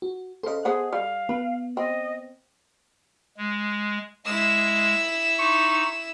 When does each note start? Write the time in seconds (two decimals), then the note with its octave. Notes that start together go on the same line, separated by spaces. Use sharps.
0.02 F#4
0.43 C#3 A4 C5 D#5
0.65 B3 G#4 C5 F#5
0.93 G3 F5
1.29 B3 B4
1.77 C4 D#5
3.37 G#3
4.26 G#3 E4 E6
5.39 D#4 C#6